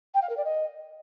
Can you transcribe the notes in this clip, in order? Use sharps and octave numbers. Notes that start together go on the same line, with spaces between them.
G5
F5
A#4
D5
D#5